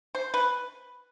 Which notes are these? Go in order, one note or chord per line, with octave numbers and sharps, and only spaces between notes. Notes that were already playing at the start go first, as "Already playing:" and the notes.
C5
B4